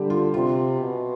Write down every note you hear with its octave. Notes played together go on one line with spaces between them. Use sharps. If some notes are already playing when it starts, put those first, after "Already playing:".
Already playing: D3 G3 G4
F4
C3 F4
B2